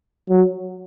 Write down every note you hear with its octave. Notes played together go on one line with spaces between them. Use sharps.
F#3